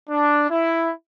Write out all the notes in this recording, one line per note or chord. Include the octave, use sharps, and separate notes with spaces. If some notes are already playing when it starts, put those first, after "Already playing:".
D4
E4